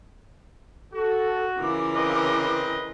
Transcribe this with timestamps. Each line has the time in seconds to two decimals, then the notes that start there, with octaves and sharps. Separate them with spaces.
0.93 F#4 A4
1.58 C#3 E3 F4 A#4 D6
1.95 C4 B4 D#5